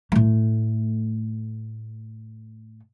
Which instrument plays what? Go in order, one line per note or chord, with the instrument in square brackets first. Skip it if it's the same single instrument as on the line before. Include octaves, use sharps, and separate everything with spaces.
[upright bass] A2 A3